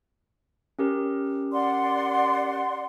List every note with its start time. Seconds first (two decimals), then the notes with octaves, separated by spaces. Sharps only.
0.79 C#4 G4 A#4
1.52 D5 F#5 C6